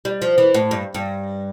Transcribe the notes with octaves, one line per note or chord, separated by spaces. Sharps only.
G3
F3
E3
A2
G2
G2